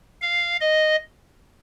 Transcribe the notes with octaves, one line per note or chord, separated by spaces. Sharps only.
F5
D#5